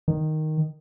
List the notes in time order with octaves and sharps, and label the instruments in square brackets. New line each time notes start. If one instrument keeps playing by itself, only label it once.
[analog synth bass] D#3